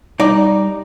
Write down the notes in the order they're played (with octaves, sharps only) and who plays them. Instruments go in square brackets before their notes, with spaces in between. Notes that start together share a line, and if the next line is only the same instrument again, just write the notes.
[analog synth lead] G3 [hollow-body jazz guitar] D#4 D5